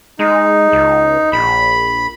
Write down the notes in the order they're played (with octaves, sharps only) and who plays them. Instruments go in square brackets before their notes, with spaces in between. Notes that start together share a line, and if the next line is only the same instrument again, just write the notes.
[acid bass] G#3 [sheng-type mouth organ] D#4
[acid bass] C#2
[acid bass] A#1 [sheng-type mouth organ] B5